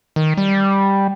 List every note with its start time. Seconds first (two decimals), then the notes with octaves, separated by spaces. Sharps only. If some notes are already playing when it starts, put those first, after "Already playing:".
0.16 D#3
0.37 G3